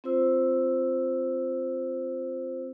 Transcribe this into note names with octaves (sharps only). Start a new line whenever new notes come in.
C4 F4 C5 E6